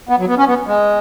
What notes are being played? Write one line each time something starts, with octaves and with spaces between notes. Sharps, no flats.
B3
F#3
B3
C#4
B3
G#3